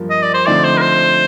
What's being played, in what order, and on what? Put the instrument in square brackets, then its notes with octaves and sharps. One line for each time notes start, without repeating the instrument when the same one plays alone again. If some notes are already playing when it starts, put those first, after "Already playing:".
Already playing: [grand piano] G2 F3 A#3
[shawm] D#5
D5
C5
[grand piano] D3 F3 A3 C4 D#4 [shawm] D5
[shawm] C5
A#4
C5